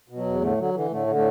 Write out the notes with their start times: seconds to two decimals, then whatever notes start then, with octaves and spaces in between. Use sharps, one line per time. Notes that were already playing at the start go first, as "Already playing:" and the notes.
0.09 B2
0.17 F#3
0.26 E2
0.42 A2 D3 A3
0.58 D3 F#3
0.74 D3 E3
0.91 A2 D3 A3
1.07 D3
1.15 A2 A3